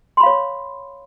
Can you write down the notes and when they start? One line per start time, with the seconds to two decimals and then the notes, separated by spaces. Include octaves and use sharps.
0.17 C6
0.20 B5
0.23 F5
0.26 C#5